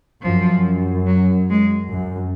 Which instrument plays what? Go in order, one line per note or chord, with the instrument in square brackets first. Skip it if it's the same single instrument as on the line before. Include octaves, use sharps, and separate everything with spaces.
[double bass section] F#2 [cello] F3
[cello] F#3
G#3
[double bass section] F#2